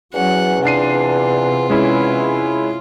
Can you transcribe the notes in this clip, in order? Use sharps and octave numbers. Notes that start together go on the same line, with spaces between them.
E2 F#3 C#4 F#5
C3 D4 F4 C7 D#7
E2 G#3 C#4 E4